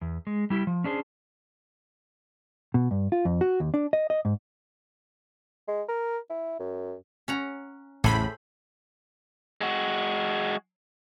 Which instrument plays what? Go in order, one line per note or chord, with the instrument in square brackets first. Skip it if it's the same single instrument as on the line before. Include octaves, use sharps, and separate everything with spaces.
[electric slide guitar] E2
G#3
G3 E4 G4
F3
C#4 D4 G#4 C5
[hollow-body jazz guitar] B2
G2
F4
F2
F#4
D#2
D4
D#5
D#5
G#2
[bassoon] G#3
A#4
E4
F#2
[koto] C#4 F#5 A#5
[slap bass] A1 E2 C#3 [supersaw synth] A2 B5 [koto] A4 C5 G#5
[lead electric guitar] G#3 F#4